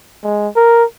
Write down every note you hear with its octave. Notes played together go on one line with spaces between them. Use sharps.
G#3
A#4